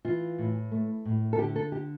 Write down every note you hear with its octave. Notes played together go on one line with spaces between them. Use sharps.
E3 F4
A2
A3
A2
A4
D3 G4
A4
G4